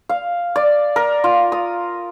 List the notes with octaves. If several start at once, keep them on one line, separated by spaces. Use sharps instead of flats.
F5
D5
A#4
F4
D#6